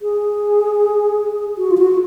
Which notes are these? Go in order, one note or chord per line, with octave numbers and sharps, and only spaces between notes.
G#4
F#4
F4
F#4